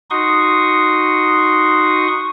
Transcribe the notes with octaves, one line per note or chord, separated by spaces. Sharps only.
D#4 F#4 C6 C#6 D#6